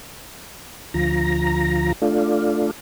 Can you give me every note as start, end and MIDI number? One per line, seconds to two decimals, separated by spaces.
0.94 1.92 38
0.94 1.92 53
0.94 1.92 82
2.02 2.71 57
2.02 2.71 62
2.02 2.71 65